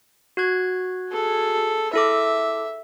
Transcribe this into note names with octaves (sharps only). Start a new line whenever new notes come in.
F#4 F#6 G#6
G#4 A4
E4 A4 E5 D6